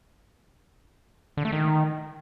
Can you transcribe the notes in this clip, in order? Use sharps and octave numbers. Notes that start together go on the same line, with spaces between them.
D3
A3
D#3